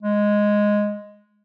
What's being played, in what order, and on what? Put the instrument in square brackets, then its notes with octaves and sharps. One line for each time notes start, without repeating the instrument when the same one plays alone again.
[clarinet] G#3